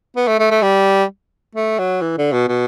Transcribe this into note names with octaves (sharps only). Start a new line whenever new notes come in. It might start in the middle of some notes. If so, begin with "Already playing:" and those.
B3
A3
A3
A3
G3
A3
F#3
E3
D3
B2
B2